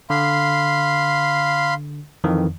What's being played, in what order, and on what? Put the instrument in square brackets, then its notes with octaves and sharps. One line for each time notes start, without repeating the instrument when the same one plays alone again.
[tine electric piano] D3 [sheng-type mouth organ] F5 B5 C6
[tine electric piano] F2 D#3 E3